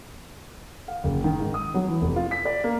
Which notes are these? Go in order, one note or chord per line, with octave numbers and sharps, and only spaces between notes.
F5
F#1
D#3
G#2
D#6
F#3
E3
F1
F4
B6
D5
A#3